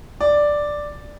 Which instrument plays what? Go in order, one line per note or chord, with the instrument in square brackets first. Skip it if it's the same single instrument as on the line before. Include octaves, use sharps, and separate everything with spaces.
[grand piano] D5